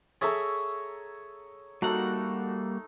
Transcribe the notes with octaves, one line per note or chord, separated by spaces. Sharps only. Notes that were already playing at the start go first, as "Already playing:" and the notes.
G#4 A4 C#5 E5 A#5
G3 A3 A#3 D#4 F#4 F#5